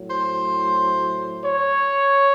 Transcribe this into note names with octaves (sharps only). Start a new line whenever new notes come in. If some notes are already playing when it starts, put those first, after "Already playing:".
Already playing: A2 F#3
C5
C#5